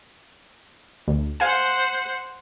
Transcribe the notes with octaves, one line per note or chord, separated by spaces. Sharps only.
D2
C5 F5 F#5 G#5